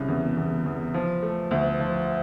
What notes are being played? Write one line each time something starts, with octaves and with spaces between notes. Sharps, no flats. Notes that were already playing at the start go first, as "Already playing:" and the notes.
Already playing: C2 C#3
E2
E2
E2
F3
A3
D2
F3